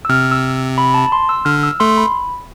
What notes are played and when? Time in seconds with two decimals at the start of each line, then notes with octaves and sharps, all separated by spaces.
0.05 E6
0.09 C3 F6
0.32 E6
0.78 B5
0.94 A5
1.12 C6
1.29 E6
1.45 D3 F6
1.63 E6
1.80 A3 C6
1.98 B5